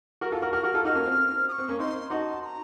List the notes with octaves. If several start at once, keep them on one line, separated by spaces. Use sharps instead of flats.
F#4 A#4
F4 A4
F#4 A#4
F#4 A#4 F6
F#4 A#4
F4 A4
D#4 F#4 F6
A#3 C#4
C4
D#6
C#6
C4
A#3 C#4
C4 D#4 C6
D#4 F#4 A5 A#5
C6
A#5